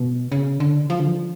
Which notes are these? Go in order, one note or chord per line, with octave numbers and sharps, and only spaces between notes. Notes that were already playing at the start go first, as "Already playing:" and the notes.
Already playing: B2
C#3
D3
F3
D3
F3